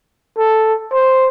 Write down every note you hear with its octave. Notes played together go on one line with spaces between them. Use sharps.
A4
C5